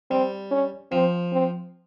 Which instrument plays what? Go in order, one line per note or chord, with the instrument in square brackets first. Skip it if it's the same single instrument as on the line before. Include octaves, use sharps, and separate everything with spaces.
[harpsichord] G3 [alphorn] C4
[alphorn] C#4
[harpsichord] F3 [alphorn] C4
[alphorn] C4